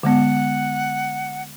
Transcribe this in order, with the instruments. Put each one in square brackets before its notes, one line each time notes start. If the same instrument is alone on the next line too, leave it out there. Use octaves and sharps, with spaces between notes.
[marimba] D3 G#3 B3 [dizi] F#5